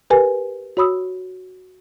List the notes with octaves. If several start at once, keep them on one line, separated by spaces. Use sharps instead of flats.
G4 A#4 B4 G#5
F#4 C#5 B5 D#6 E6